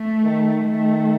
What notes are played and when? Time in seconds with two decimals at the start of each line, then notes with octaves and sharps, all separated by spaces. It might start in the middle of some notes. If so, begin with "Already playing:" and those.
Already playing: A3
0.23 D#3
0.64 D#3 A3